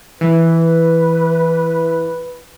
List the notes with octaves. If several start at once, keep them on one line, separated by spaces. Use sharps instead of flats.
E3 B4